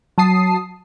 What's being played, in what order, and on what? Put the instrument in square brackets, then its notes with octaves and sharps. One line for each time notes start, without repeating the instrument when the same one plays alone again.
[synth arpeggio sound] F#3 A5 D#6 C7